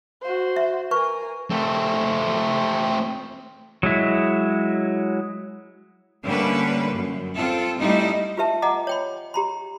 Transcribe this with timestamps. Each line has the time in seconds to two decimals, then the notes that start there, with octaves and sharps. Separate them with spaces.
0.22 F#4 C5
0.56 E5
0.91 A#4 B4 G#5 C#6
1.51 A3 C4
3.83 F#3 G#3 E4
6.24 D3 G3 A3 A#3 C#4 B4
6.94 F#2
7.35 C4 F4 A4
7.78 G3 A3 D#4 E4
8.37 F4 G4 B4 E5 A5
8.62 D#5 F#5 G#5 A#5 D6
8.87 C#5 G5 B5
9.34 G4 A#5 B5